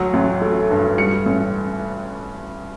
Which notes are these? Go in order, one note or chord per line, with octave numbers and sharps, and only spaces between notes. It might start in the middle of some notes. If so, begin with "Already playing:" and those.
Already playing: D2 F#3
A1
A3
G2
G3 C#7
A1